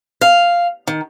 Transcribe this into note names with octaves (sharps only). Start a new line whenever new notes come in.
F5
D#3